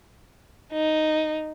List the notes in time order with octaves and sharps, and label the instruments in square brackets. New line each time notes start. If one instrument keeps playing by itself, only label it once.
[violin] D#4